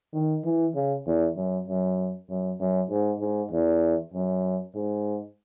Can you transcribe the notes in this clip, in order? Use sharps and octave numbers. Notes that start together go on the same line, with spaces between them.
D#3
E3
C#3
E2
F#2
F#2
F#2
F#2
G#2
G#2
E2
F#2
G#2